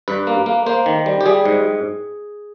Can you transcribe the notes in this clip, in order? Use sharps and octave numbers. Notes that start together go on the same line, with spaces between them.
G2 B4
A#3
A#3
A#3 C5
D#3
G3
G4
G3 G#4
G#2